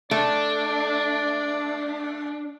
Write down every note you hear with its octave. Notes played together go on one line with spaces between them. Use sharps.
A3 D4 D5